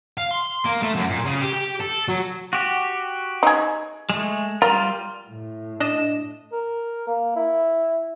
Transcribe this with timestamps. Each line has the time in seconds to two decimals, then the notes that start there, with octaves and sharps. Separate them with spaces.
0.18 F5
0.31 C6
0.65 A#3
0.82 A3
0.95 F#2
1.10 A#2
1.25 C#3
1.41 G4
1.53 G4
1.80 A4
2.08 F#3
2.53 F#4 G4
3.43 D#4 G#4
4.10 G#3 A3
4.62 G3 F4 A#4
5.29 A2
5.80 D4 D#5 E7
6.52 A#4
7.07 A#3
7.36 E4